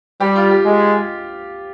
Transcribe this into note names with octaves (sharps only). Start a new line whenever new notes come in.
G3 G4
F4
G4
G#3